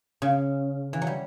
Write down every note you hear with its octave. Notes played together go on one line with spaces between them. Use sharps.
C#3
E3
F#3
G3